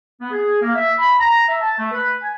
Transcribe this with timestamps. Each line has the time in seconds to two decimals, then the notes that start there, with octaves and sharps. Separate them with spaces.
0.20 B3
0.31 G#4
0.62 A#3
0.75 E5
0.98 B5
1.19 A#5
1.47 E5
1.61 A5
1.78 A3
1.92 B4
2.22 G#5